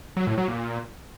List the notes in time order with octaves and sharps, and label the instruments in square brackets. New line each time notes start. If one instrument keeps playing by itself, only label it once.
[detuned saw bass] F#3
A2
F#3
A#2